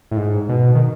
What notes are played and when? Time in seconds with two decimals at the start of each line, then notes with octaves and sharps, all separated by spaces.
0.11 A2
0.17 G#2
0.49 B2
0.75 D#3